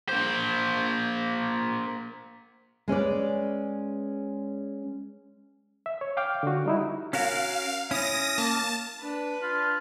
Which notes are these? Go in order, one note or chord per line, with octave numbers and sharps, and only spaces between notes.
A#3 C5
G#3 C#4 B4 D5
E5
C#5
F5 G5 D6 F6
D3 F#4
G3 D#4 E4
C#4 F#4 A#4 F5
C#4 E4 D#6 A#6
A#3 A5
D4 B4
D4 F4